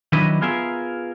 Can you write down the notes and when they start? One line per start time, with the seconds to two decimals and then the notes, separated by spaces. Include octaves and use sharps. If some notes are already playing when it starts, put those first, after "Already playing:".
0.12 D#3 F#3 D4 E4 B4 D#5
0.41 B3 F4 G#4 A#4 E5